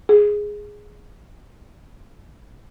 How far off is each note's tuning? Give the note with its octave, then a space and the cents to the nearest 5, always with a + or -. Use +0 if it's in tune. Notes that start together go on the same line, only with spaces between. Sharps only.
G#4 +0